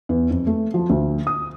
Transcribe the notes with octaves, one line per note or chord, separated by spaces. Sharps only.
E2
F2
A3
F3
D2
D#6